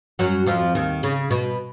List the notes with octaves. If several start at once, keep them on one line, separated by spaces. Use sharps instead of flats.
F#2 F#3
F2 F3
D#2 D#3
C#3
B2